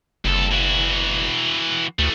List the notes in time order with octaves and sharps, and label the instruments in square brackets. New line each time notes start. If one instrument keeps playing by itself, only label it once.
[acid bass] F#1 [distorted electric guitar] C2 A4
[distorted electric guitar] E3 F#4
[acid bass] D2 [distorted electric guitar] E3 A3